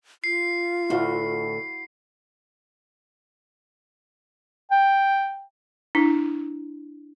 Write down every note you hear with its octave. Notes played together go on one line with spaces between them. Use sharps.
F4 C7
D2 A2 E4 F#4 F5
G5
D4 E4